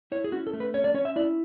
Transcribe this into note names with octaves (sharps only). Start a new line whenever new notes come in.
E4 C#5
G#4
C#4 F#4
A4
A3
B4
C#4 C#5
D5
C#4 C#5
E5
E4 D5